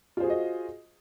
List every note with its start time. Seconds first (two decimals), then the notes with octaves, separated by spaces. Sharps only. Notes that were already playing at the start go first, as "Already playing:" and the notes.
0.17 F4
0.20 C5
0.23 G#4
0.27 F#4
0.30 D#5